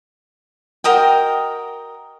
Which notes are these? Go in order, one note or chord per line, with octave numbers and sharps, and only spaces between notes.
F#4 A#4 D#5 G5